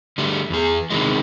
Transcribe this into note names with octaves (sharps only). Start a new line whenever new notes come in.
D3 G3 A3
E2 G#4
C3 D#3 E3 G#3